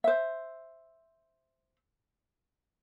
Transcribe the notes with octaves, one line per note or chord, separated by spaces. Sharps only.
C5 E5